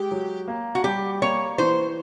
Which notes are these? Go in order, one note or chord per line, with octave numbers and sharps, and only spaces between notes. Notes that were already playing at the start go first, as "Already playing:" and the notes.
Already playing: G#3 G4
F#3
A#3
F#4
G3 G4
A#3 C#5
E3 C5